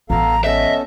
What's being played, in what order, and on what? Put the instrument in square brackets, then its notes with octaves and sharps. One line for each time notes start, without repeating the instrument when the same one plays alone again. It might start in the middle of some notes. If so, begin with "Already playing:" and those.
[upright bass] A1 G3 [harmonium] B3 A4 F5 [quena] A#5
[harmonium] B3 C#4 A4 [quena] D#5 [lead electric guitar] E5